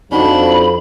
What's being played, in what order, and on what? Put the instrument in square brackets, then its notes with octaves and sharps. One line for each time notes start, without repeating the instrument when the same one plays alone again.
[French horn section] F2 F3 [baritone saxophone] D4 [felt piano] D#4 F#4 [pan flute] B5